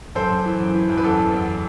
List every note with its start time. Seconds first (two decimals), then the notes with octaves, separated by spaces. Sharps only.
0.15 F#2 A4 C5
0.30 F#2
0.45 E3
0.60 F#2
0.74 E3
0.89 F#2
0.97 B4
1.04 E2 A4
1.19 E2
1.33 E2